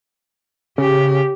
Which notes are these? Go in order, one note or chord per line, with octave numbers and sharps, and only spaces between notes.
C#3 G4